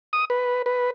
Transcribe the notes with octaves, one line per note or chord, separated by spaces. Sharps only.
D#6
B4
B4